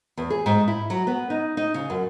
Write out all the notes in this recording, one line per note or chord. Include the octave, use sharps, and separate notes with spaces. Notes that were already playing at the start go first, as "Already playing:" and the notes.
E2
G#4
G#2
E4
F#3
B3
D#4
D#4
C#3
F#2